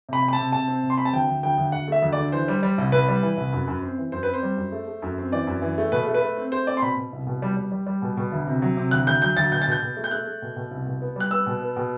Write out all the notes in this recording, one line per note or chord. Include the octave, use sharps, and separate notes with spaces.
C3 B5
C3
B5
A5
C3
C3 A5
C4
C3
C6
C4 B5
A5
D2 G5
D2
D2 G5
D2
D2 F#5
A3 E5
D2
D5
D3
E3 C5
G3
G3
C2
C2 B4
G3
E3
C2
F#2
F#2
C4
E3
F#2 C5
C4 B4
C5
G3
F#2
A3
A3
F#2
C4
E3 D5
F#2
E3
A3
B2 B4
A3
B4
A3
C4
A3 C5
C4 D5
C6
B2 B5
B2
C2
B2
G3
G3
G3
G3
B2
B2
D2
C3
F#3
C3
D2 F#6
D2 G6
F#3 G6
D2 A6
B2 G6
A6
B2 G6
B2
A3
G6
A3 F#6
A3
B2
B2
C2
B2
B3
G3 F#6
B3 E6
B2
B3
B2